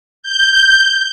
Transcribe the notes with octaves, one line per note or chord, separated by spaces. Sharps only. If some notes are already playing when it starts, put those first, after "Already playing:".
G6